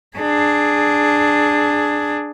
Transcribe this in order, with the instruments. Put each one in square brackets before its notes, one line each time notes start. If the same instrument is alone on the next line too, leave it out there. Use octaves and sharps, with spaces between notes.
[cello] D4 G#4